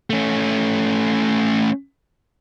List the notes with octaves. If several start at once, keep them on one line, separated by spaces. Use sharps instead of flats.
A3 C#4